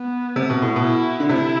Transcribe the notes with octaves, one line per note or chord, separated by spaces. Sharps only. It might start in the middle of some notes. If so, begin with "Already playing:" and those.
Already playing: B3
C3
B2
A2
B2
E4
D3
C3 E4